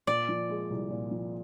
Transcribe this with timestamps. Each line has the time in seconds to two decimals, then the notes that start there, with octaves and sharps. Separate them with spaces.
0.07 A#2 D5
0.29 F3
0.49 G#3
0.70 C2
0.90 A#2
1.11 F3